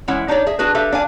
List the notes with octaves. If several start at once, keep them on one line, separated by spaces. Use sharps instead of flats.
E3 G#3 C#4 E4 F#5
D4 D#4 G4 C#5 D5
G#4 E5
D4 F#4 G#4 B4
G4 A4 B4 E5 F5
D4 F5 G#5